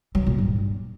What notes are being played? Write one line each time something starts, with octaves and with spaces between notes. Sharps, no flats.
F#3
A#2
G2